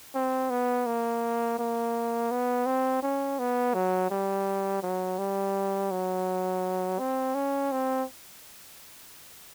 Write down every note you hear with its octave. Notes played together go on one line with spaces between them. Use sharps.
C4
B3
A#3
A#3
B3
C4
C#4
B3
F#3
G3
F#3
G3
F#3
C4
C#4
C4